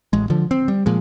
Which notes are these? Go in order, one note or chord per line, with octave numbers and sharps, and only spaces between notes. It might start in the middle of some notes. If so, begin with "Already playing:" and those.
A1 G#3
D3 F3
C4
G3
A#2 F3 G#3